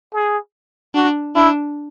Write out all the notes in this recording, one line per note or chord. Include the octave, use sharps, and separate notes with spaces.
G#4
D4 F#4
D4 E4